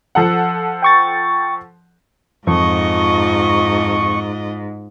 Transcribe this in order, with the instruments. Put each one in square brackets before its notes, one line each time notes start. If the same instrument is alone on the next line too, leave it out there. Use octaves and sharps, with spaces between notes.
[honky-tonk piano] F3 A4 F#5
[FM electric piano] G5 C#6 A6
[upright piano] F2 [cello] G#2 [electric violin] F4 D#5 [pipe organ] C#6